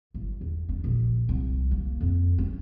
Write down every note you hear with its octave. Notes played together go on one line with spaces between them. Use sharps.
G1
E2
D4
A#1
C2
A#3
F2
C#4